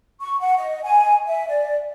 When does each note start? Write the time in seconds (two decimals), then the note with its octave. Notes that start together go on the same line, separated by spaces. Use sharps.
0.21 C#6
0.40 F#5
0.58 D#5
0.83 G#5
1.27 E5
1.47 D5